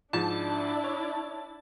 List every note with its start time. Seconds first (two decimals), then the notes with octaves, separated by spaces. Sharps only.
0.13 G#2 F3 D4 E4 A5
0.84 C#5